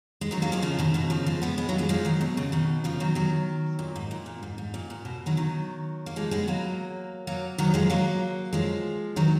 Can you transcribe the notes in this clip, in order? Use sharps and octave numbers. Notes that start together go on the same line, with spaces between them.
G#3
D#3 F#3
F#3 A#3
F3 G#3
C#3 F3
B2 D#3
B2 D#3
C#3 F3
F3 G#3
G#3 B3
G#3 B3
F#3 A#3
F3 G#3
F3 G#3
D#3 F#3
B2
C#3
B2 D#3
C#3 F3
D#3 F#3
D#3 F#3
A#2
G#2
A#2
A#2
G#2
G#2
A#2
A#2
B2
D#3 F#3
D#3 F#3
A#3
F3 G#3
G#3 B3
F#3 A#3
F#3 A#3
D#3 F#3
F3 G#3
F#3 A#3
F3 G#3
D#3 F#3